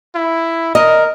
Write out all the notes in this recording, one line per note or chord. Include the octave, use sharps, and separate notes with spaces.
E4
A#4 D#5